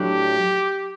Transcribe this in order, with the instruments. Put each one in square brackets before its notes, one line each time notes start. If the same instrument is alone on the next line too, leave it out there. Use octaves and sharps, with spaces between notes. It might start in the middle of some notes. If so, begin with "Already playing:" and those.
Already playing: [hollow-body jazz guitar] A2 F#3 A3 D4 [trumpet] G4